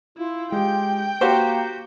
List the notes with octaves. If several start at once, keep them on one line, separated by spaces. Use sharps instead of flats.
E4 F4
G#3 G4 G5 G6
A#3 F#4 G4 C5 C#6